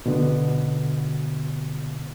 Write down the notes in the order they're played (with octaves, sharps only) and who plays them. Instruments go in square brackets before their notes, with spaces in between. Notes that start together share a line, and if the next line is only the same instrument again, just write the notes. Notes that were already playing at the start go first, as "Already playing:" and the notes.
[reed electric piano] B2 D3 B3